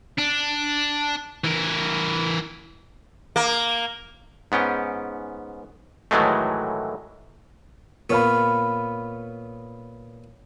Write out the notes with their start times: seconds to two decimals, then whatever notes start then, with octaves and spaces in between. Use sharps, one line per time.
0.18 D4
1.44 E3 A#4
3.36 A#3
4.52 G#2 B3 C#4 G5
6.11 A2 D#3 E3 F#3 G#3 A3
8.10 A#2 B3 C#5 F5 B5